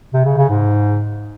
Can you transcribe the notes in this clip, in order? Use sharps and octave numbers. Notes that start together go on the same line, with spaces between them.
C3
C#3
C#3
G#2